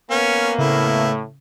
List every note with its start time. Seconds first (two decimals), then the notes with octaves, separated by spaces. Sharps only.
0.10 A#3 B3 C#4
0.58 A2 C#3 A3 E4